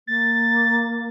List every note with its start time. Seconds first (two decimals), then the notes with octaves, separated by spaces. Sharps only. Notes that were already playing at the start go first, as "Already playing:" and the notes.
0.07 A#3 A6